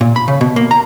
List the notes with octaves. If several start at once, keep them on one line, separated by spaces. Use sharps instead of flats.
A#2
B5
C#3
B2
A#3
A#5